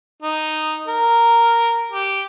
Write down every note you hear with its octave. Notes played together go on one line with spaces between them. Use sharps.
D#4
A#4
G4